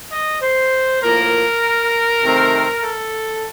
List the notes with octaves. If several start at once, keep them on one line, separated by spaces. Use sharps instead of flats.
D#5
C5
A2 F3 A#3 A#4
C3 D#3 A3 C4
A4